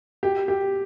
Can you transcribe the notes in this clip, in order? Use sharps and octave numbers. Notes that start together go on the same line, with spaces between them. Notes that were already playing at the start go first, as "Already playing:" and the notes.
G4
G4